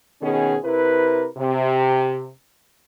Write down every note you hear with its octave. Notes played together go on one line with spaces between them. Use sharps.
B2 D#3 B3 C#4 G#4
C3 E4 A#4 B4
C3